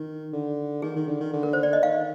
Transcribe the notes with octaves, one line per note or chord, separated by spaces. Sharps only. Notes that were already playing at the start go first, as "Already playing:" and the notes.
Already playing: D#3
D3
D#3 G#4
D#3
D3
D#3
D3
A#4
C5
D5
D#5
D#3 F5